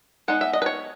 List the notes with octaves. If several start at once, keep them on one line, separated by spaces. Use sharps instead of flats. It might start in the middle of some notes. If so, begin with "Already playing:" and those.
G#3 B3 D#4 F#5
E5
D#5
B4
C#5